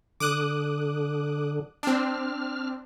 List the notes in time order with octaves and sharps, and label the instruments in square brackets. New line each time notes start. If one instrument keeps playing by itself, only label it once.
[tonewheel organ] D3 [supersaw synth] D6 D#6 F#6
[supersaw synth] C4 D4 [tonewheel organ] F6